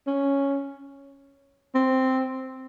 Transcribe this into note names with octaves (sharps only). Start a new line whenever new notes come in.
C#4
C4